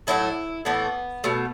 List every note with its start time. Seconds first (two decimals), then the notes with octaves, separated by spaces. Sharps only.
0.07 A2 F#3 A3 E4
0.65 A2 E3 A3 B3
1.24 B2 A3